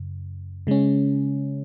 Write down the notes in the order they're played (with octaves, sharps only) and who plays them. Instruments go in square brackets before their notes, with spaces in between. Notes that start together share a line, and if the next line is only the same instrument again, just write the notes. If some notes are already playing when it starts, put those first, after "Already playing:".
Already playing: [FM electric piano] F#2 C#3
C#3 G#3 C#4